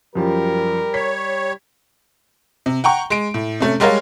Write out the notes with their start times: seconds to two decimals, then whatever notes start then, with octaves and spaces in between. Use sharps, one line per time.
0.15 F#2 F3 G3 G4 A#4
0.94 C#5 B6
2.66 C3
2.84 F#5 G5 A#5 C#6
3.10 G#3 D7
3.34 A2
3.60 C3 A3 C#4
3.80 G3 G#3 G4 A#4 C#5 F5